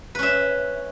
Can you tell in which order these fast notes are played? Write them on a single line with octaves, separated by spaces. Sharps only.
B4 C#4 E5